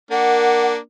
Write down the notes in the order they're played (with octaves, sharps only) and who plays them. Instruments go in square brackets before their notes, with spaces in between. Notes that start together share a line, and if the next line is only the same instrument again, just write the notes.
[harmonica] A#3 D4 [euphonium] A#4 [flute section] F#5